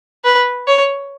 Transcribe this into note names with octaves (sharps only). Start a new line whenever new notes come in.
B4
C#5